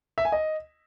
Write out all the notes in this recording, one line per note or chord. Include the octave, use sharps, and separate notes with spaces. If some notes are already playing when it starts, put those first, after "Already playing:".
E5
G#5
D#5